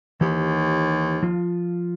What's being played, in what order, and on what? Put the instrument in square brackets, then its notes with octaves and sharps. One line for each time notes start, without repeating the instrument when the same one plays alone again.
[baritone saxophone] D#2 [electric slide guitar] E3 G4
[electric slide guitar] F3 F4